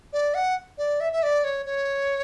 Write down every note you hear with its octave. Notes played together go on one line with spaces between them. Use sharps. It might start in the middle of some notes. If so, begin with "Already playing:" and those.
D5
F#5
D5
E5
E5
D5
C#5
C#5